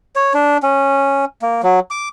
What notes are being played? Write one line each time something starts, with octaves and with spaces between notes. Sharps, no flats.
C#5
D4
C#4
A#3
F#3
D6